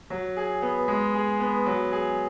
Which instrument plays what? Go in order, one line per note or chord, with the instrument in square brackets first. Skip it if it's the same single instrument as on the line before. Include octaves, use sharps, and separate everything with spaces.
[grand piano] F#3
G#4
B3
G#3
G#4
B3
F#3
G#4